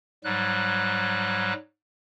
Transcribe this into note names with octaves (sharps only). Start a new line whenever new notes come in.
G#2 F#3 G3 F#6